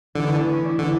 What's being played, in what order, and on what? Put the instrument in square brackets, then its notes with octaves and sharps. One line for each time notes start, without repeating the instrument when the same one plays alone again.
[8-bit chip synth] D3 [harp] E3
[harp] A3 B3
B3
C#4
D4
E4
[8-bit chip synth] D3